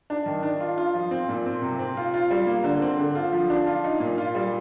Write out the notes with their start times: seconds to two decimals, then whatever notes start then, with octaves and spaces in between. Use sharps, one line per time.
0.10 D4
0.26 D#3
0.43 D4
0.60 F4
0.78 F4
0.94 F3
1.11 C4
1.29 A#2
1.46 C4
1.62 C3
1.79 C4
1.97 F4
2.14 F4
2.31 G3
2.47 A#3
2.64 D3
2.82 C4
2.99 D3
3.15 F4
3.32 F3
3.50 D4
3.67 F4
3.84 D#4
4.00 A#2
4.18 F4
4.35 G3